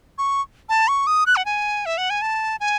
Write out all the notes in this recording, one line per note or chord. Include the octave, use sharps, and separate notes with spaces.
C#6
A5
C#6
D#6
F#6
F#5
G#5
E5
F#5
G#5
A5
G#5